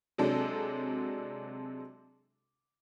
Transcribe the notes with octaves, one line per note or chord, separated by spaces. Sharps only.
C3 F#3 G#3 D4 A4